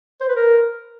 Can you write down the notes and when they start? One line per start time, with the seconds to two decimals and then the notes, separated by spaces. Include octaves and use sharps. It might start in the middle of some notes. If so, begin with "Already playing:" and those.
0.20 C5
0.28 B4
0.36 A#4